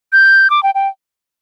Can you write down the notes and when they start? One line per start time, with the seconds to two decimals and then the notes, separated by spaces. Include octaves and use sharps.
0.12 G6
0.50 D6
0.63 G5
0.74 G5